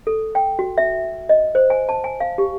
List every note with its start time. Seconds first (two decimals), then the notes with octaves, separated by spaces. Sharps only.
0.07 A4
0.35 G5
0.59 F#4
0.78 E5
1.29 D#5
1.55 C5
1.70 G#5
1.89 A5
2.04 G#5
2.20 F5
2.38 G4